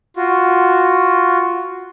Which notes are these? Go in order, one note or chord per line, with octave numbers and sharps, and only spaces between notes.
F4 F#4